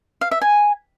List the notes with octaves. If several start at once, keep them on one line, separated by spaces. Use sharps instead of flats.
F5
E5
G#5